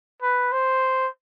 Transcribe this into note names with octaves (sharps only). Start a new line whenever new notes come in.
B4
C5